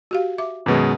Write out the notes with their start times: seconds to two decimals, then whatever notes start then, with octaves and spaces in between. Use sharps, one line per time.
0.11 F#4 G4 F5
0.38 E5 D6
0.66 F#2 B2 D#3 G#3 B4